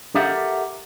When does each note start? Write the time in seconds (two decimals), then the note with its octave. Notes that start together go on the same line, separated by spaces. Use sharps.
0.15 G4 A4 A#4 E5 F#5